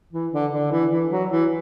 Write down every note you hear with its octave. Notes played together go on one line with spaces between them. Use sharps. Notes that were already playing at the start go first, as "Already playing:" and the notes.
E3
D3
D3
E3
E3
F#3
E3